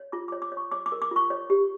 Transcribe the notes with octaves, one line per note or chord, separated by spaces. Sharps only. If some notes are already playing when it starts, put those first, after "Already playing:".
Already playing: C#5
F4 D6
C#5 D6
D6
C#5
C#6
C#5 D6
D6
A#4
D6
F4 C#6
C#5
G4